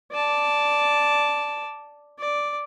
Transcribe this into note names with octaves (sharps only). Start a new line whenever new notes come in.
D5 A5
D5